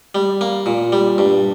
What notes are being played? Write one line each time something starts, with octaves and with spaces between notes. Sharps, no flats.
G3
A#3
A#2
G3
G2